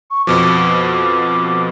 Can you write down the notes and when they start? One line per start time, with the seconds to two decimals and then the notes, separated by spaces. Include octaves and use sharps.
0.11 C#6
0.27 F2 B2 F3 D6
0.94 D6